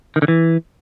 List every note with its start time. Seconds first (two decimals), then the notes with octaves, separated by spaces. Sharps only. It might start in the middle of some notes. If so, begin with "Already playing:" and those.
0.16 D#3
0.22 D3
0.28 E3